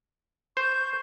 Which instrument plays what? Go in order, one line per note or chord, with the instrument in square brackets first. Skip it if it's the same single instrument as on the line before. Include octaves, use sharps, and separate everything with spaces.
[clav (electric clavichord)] C5 [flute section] C#6 G6